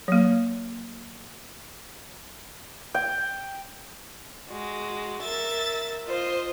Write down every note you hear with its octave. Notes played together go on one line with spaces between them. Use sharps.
F#3 A#3
G5
G#3 F#4
A#4 E5 A6
F4 C5 D#5 F5